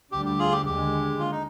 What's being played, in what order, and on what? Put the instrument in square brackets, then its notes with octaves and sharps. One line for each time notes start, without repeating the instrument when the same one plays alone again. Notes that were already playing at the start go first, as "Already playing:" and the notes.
[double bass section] D2 D3 G3 [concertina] G4
[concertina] G4
F4 G#4
G4
[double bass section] D#2 D3 G#3 [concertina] G4
[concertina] F4
D#4